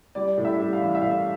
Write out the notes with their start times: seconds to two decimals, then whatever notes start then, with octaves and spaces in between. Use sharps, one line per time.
0.15 G3 D5
0.38 A2
0.45 E5
0.58 G3
0.73 F5
0.80 A1
0.95 E5
1.01 A2 F5